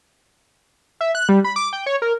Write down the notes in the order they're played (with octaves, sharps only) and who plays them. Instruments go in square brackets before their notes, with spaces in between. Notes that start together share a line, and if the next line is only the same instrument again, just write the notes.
[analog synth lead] E5
F#6
G3
B5
D6
G5
C#5
A#4